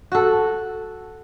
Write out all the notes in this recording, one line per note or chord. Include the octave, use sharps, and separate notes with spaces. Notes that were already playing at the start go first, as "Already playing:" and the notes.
F#4 A4